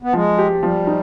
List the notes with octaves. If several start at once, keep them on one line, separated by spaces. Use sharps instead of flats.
B3
F3 G#3
G4
F3 G3
D#4